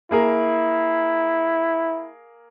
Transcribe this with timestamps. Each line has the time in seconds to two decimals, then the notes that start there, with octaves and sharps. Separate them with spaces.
0.11 A#3 E4 G#4 A#4